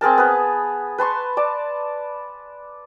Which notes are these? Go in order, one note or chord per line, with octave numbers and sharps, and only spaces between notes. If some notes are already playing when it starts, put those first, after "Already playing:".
C4 G#4 A#4 A5
B3 B4
B4 A5 C6 C#6
D5 A5